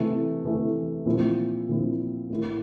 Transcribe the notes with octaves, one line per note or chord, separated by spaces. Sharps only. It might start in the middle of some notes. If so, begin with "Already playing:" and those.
Already playing: C3 E3 A3
C3 E3 A3
A#2 F3 C4 E4
A#2 F3 C4 E4
A2 E3 A#3 E4